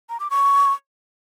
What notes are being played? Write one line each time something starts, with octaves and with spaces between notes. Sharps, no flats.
A#5
D6
C#6